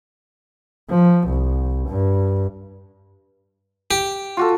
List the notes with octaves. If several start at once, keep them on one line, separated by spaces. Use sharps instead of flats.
F3
C2
G2
G4
F4 F#4 A4